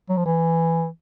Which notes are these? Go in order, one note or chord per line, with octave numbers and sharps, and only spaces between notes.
F#3
F3
E3